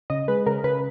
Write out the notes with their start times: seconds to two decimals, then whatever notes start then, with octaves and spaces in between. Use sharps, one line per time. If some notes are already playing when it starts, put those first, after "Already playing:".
0.10 C#3 D#5
0.28 G#3 B4
0.46 C#3 A#4
0.64 C#3 B4